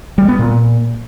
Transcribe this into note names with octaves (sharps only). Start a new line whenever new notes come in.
G3
B3
A#2